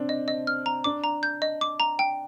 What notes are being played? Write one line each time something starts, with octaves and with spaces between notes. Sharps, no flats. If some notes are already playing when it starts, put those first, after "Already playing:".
Already playing: C4 D4
D#5
D#5
F6
A#5
D4 D6
A#5
G6
D#5
D6
A#5
G5